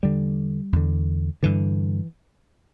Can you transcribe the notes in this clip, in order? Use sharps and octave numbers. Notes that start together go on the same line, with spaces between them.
E2 D3 G3
E2 D3
G2 D3 E3